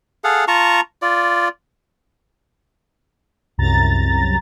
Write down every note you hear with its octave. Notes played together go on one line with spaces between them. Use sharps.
G#4 A4 F5 F#5
F4 A5 A#5 C#6
F4 D5
C2 F#2 A#5 A6